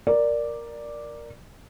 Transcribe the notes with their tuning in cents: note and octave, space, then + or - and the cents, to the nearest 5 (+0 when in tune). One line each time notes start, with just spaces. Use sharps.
A#4 +0 D5 +0